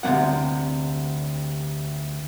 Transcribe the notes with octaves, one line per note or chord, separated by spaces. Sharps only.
D2 C3 A3 A#3 F#5